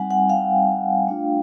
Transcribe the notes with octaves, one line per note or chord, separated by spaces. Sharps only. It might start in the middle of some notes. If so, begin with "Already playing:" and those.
Already playing: G3 C4 D#4 F#5 G#5
F#5 G#5
F5 G5
A3 D4 F4